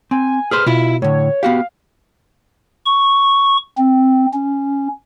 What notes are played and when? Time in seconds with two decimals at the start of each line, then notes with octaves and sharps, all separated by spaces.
0.11 C4 G#5
0.51 G#4 B4 C5 F6
0.67 B2 E4 F4
1.02 A2 D3 C#5
1.43 B3 F#4 G4 F5
2.86 C#6
3.78 C4
4.34 C#4